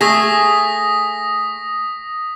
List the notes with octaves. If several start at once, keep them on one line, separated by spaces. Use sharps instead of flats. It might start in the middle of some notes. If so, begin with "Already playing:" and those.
A3 G#4 D#6 A#6 B6